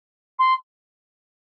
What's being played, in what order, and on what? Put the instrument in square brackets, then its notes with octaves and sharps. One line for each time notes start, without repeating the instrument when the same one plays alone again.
[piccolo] C6